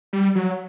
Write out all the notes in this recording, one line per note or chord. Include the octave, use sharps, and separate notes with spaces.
G3
F#3